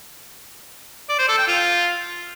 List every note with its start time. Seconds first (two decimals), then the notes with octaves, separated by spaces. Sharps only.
1.09 D5
1.19 C5
1.28 A4
1.38 G5
1.48 F4